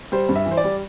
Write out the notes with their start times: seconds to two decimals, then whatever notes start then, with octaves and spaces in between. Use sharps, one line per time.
0.12 G3 C5
0.29 G2
0.36 E5
0.46 E3
0.52 C5
0.57 D5
0.64 G3